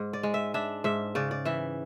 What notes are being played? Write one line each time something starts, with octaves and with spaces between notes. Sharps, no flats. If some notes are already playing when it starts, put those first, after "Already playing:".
Already playing: G#2
D5
G#3
E5
D4 E5
G#2 E5
C#3 D5
D5
E3 E5